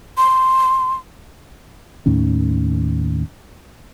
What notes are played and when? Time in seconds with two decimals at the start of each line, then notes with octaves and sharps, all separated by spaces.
0.17 C6
2.06 D#2 A2 D#3 C#4